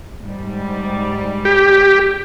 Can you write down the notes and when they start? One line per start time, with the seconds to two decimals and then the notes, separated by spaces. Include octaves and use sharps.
0.20 G#2 G3
1.45 G4